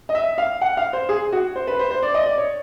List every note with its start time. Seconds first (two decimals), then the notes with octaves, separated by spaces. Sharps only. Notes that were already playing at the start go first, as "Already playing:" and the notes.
0.09 D#5
0.15 E5
0.38 F5
0.61 F#5
0.77 F5
0.93 C5
1.09 G#4
1.32 F#4
1.56 C5
1.67 B4
1.79 C5
1.91 C5
2.03 D5
2.14 D#5
2.26 D5
2.38 C#5